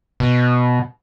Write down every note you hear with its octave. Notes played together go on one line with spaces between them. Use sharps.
B2